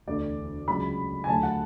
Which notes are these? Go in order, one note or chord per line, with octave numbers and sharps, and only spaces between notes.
E1 D2 D3 D5
C#2 C#3 F#3 B5
G#5
D2 D3 F#3 A3 A5
F#5